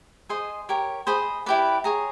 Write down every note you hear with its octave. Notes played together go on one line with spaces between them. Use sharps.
G#4 C5 D#5 C6
G4 A#4 C#5
G#4 C5 D#5 B5
E4 G4 B4 D5
G#4 C#5 A#5